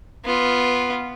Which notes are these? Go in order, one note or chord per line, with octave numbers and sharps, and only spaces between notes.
B3 F4